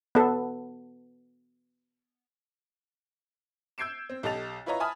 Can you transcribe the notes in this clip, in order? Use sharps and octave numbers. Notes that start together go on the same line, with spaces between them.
B3 A4
E6 G6 G#6 C7 D7 E7
C4
B1 G4 A4 D#5 A6 F7
E4 F4 B4 C#5 D#5 A#5
E5 G#5 A5 B5 D#6 F6